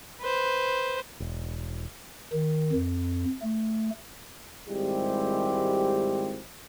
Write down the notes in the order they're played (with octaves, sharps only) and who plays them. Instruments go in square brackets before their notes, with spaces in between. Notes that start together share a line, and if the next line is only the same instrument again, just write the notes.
[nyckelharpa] B4 C5
[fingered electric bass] E1
[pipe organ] D#3
F2
A3
[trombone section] G#1 G3 G#3 C4 E4 G4